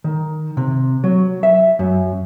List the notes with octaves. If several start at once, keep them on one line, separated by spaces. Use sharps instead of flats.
D#3
C3
F#3
E5
F#2